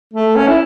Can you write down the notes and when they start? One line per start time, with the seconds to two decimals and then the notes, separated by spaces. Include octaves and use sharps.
0.13 A3
0.36 C#4
0.48 E4